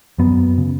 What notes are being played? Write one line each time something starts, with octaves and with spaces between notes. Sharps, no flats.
F#2 F#3 B3
C#3